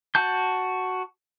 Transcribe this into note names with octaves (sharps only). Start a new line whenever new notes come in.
F#4 A5 G6